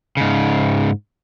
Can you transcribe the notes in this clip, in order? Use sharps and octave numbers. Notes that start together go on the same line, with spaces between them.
G#2 C#3